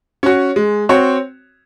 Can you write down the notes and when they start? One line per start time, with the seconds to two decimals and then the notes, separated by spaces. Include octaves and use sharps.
0.23 C#4 F#4
0.56 G#3
0.89 C4 F#4 C#5